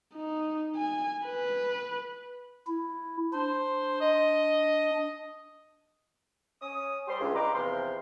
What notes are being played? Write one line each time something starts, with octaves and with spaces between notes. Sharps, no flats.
D#4
G#5
B4
E4
D4 C5
D#5
C#4 D#6
G3 G4 C6
C#2 G2
G4 B4 D#5 A#5 C6 D6
E2 C3 F3 B4 F5 C6